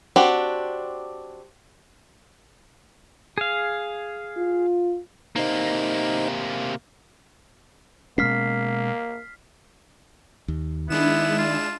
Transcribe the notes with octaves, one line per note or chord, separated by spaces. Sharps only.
C4 D4 F#4 G4
G#4 F5
F4
C3 A#3 D#4 C5 D#5
B2 G#3 A#3 C#4 F6 B6 C7
D#2
D#3 G#3 B3 D4 E4 E7
F4